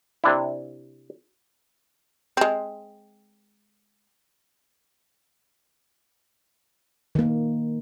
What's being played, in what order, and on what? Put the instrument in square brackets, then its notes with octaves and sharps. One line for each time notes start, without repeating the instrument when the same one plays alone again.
[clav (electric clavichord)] C3 D4 E4
[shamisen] G#3 C4
[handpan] D#3 A#3